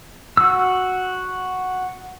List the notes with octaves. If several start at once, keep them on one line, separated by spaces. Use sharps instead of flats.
F#4 E6